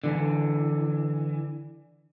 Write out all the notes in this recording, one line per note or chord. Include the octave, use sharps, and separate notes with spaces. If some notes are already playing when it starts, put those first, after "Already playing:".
D3 E3